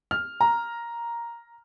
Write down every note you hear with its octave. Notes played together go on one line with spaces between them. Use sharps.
F6
A#5